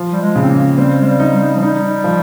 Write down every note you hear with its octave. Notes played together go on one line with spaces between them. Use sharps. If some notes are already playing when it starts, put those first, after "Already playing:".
Already playing: F3
G3
G#3
C#3
C4
A#3
G3 C4
G#3
G3
D#4
G3
F3
G3 D#4
F3